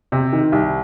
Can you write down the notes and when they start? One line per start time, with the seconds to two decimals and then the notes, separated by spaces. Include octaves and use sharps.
0.12 C3
0.33 D#3
0.52 C2